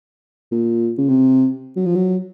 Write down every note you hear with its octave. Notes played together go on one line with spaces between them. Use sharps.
A#2
C#3
C3
F#3
F3
F#3